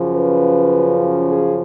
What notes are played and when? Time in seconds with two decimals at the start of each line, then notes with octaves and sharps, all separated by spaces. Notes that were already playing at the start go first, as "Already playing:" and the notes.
Already playing: F#2 C#3 F3
0.15 B4
1.29 G#4